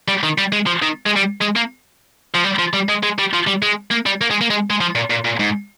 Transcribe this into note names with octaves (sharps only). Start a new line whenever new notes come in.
G3
D#3
G3
G#3
F3
D#3
G#3
G3
G#3
A#3
F3
G3
F3
G3
G#3
G#3
G3
F3
G3
G#3
A#3
G3
A#3
G#3
A#3
G#3
G#3
F3
A#2
A#2
A#2
G#2